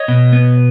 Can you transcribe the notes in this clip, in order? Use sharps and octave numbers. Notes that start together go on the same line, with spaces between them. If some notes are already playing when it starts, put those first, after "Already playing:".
Already playing: C#5 D#5
B2
B3